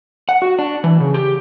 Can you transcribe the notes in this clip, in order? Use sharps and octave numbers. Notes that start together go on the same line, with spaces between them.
F#5
F#4
D4
E3
C#3
G4